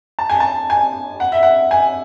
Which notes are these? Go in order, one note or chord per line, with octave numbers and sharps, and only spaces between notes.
A5
G#5
A5
G#5
F#5
E5
F#5
G#5